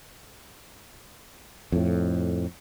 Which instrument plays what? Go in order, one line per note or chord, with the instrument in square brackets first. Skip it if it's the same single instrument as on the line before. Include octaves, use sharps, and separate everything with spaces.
[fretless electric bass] F2 A2